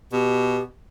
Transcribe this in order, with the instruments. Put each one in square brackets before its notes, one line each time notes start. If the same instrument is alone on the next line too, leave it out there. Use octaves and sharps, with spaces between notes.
[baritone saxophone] B2 [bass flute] G4